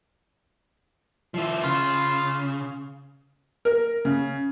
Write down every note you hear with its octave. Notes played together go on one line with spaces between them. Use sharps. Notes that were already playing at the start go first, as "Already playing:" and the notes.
F3 E4
C#3 F4
A#4
C#3